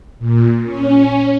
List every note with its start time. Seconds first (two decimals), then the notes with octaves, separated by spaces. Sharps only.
0.19 A#2
0.63 C#4